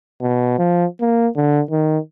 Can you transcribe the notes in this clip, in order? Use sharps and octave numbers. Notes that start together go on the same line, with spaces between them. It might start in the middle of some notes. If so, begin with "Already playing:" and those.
B2
F3
A#3
D3
D#3